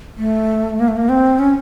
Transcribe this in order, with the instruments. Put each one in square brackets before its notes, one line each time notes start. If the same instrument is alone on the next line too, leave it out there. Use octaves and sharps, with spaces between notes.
[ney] A3
A#3
A3
A#3
C4
C#4